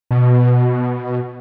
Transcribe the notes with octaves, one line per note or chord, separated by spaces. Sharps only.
B2